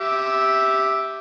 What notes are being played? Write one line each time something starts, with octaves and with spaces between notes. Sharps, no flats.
G4 E5